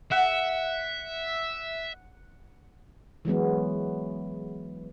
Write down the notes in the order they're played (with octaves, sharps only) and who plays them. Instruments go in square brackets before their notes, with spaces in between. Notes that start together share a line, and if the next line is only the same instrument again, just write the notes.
[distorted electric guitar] E5 [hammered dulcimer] F#5
[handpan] E3 F#3 G#3 B3